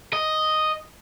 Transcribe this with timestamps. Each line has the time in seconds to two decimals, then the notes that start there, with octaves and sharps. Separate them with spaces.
0.13 D#5